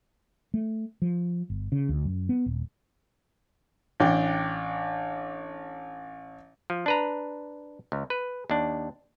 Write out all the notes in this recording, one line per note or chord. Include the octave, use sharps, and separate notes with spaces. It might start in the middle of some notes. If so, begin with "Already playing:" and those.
A3
F3
G1
C#3
D2
F#2
B3
D#1
A1 D4 G5
F3
D4 B4 A#5
C#2
B4
D#2 D4